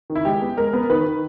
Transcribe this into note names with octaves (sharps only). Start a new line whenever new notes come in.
D#3
E4
G#3 G4
B3
G#3 A#4
B3
D#3 B4
D#3